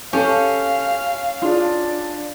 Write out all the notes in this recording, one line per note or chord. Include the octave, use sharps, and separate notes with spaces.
C#4 G4 A4 F5
D4 F4 G#4